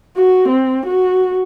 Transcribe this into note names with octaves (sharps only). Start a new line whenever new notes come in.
F#4
C4
F#4